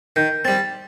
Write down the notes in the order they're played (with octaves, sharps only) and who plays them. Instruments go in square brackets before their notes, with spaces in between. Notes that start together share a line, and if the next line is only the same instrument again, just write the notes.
[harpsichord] D#3 [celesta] G6
[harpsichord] G3 C4 [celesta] A6